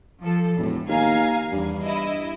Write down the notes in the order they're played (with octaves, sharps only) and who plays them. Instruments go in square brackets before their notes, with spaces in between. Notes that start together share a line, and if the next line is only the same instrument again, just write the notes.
[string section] F3 A4
[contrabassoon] E1 [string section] A2
[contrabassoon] D#2 [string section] F5 G#5 A#5
[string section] E2 [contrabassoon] G2
[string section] E4 D#5